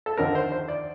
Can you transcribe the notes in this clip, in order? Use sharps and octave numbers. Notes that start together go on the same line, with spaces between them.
A4
D#2 D3 F3 C4 D#4 A#4
C5
C5
D5